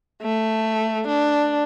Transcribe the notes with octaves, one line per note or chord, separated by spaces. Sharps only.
A3
D4